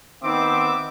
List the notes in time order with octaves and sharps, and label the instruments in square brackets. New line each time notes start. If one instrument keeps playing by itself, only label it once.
[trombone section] D#3 B3 C4 [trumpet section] E5 D6